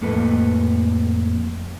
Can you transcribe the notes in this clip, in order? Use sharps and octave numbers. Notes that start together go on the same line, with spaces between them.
F2 A2 A#3 A4 B4 D#5